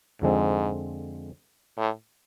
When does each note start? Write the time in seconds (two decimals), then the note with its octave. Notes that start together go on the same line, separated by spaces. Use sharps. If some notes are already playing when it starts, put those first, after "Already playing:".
0.22 F2 G#2 D3 F3 G#3 C4
1.77 A2